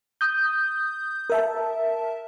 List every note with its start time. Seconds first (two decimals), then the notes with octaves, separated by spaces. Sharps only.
0.21 D#6 G6
1.30 A#4 E5 A5